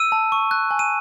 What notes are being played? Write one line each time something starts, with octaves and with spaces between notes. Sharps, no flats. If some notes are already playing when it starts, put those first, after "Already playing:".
Already playing: E6 D#7
A5
C#6
F#6
G#5
D#7